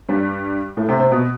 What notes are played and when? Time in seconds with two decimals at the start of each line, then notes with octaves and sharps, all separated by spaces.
0.09 G2 G3
0.77 A2 A3
0.89 C3 C4
1.00 C3 C4
1.11 B2 B3